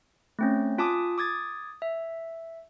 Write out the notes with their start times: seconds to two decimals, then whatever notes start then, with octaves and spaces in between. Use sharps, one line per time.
0.39 A3 C4 C#4
0.78 F4 G#5 A5 D6 D#6
1.18 D6 D#6 G#6 A6
1.82 E5